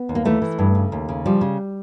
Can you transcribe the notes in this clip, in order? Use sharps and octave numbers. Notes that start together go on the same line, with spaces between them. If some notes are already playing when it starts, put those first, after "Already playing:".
Already playing: B3
D#2
A#3
E3 A3
E3
G2
C#3
D#2
C#3
F3 G3
C#3